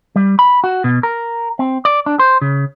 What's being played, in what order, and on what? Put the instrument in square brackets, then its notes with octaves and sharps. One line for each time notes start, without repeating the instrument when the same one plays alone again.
[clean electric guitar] G3
B5
F#4
B2
A#4
C4
D5
D4
C5
C#3